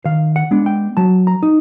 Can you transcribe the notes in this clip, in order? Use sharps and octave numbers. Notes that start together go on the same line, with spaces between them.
D#3 F5
F#5
G#3 B3 D4
G5
F#3 A5
A#5
D#4